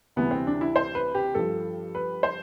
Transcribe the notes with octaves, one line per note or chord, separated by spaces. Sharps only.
D2 C3 E3 G3 B3
C4
D4
E4
C5
B4
G4
G2 F3 A4
B4
C5